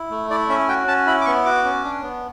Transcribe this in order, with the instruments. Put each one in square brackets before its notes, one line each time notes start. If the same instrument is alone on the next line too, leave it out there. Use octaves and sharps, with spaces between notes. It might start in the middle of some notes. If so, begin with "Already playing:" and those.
Already playing: [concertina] E4
A3
E4 D5
C#4 E5
F#4 G5
C#4 A5
E4 B5
D6
B3 C#6
F#4 D6
C#4
D4
B3